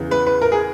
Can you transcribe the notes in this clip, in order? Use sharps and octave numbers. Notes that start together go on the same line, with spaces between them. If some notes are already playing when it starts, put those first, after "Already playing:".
Already playing: E2 C#3 E3
B4
B4
A#4
G#4